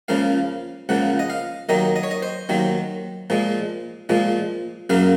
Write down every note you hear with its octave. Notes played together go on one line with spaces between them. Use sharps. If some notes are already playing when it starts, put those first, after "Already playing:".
C#2 C#3 F3 A#3 F5
C#2 C#3 F3 A#3 F#5
D#5
F5
D#2 D#3 F#3 A#3 D#5
D#5
C#5
D#5
C5
D#2 D#3 F#3 A#3
A#2 F3 G#3
A#2 F3 G#3
F#2 C#3 F#3 A#3 F5